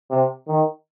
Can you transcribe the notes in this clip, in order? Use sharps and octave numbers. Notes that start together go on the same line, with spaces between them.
C3
D#3